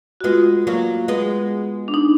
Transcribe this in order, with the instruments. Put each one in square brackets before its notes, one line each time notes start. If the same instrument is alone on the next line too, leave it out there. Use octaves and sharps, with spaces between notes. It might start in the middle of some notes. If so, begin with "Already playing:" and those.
[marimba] F#4
[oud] G#3 B3 [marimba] F4
[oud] F#3 A#3
G#3 B3
[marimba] D4
D#4